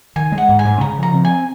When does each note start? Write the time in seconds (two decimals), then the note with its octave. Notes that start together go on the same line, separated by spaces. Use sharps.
0.16 D#3 G#5
0.32 G#3
0.38 F#5
0.49 G#2
0.59 G#5
0.65 G#2
0.81 C#3 A#5
0.98 F3
1.03 A#5
1.14 C4
1.25 G#5